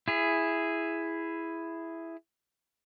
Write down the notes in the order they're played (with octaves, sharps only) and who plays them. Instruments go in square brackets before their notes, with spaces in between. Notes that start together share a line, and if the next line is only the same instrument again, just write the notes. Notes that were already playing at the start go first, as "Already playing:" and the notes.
[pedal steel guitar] E4 G#4